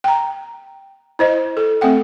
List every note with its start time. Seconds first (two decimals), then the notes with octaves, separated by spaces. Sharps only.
0.04 G5 A#5
1.19 E4 C5 D#5
1.57 A4
1.81 A3 C4 A4 F#5 G5